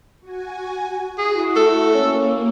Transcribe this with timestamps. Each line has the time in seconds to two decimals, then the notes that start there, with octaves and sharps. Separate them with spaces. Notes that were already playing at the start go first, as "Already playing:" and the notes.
0.21 F#4 G#5
1.18 E4 F#4 G#4
1.56 A3 A4
1.94 A#3 C#4